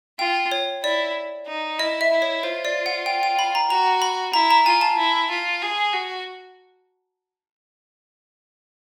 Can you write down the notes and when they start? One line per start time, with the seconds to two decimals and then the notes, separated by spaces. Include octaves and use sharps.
0.19 F4 G5
0.52 C#5
0.83 E4 D5
1.47 D#4
1.79 E4 D#5
2.01 E5
2.11 E4
2.22 C#5
2.43 F4 C5
2.65 D5
2.86 F#5
3.06 G5
3.23 G5
3.39 B5
3.55 A#5
3.70 F#4 A#5
4.02 B5
4.34 E4 A#5
4.51 A#5
4.66 F4 G#5
4.81 A5
4.98 E4
5.30 F4
5.62 G#4
5.93 F#4